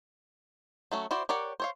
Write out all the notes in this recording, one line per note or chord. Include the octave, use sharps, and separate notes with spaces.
F#3 A3 C#4
E4 F#4 C5 D5
G4 A#4 C#5 D5 F#5
C5 C#5 F5